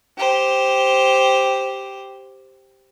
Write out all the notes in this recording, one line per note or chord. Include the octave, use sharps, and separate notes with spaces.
G4 C5